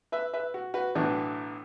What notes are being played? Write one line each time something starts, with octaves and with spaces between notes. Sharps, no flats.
B4 E5
B4 E5
F#4
F#4 B4
B1 A2 E3 D4 F#4 B4